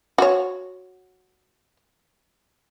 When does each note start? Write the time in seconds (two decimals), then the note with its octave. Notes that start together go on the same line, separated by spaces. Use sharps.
0.18 F#4 C#5